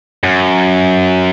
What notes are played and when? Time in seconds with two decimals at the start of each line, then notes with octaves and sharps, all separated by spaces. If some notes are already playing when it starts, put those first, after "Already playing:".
0.24 F#2